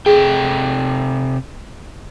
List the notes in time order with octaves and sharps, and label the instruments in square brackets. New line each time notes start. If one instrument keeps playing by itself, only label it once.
[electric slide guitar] C3 A4 G5 [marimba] G#4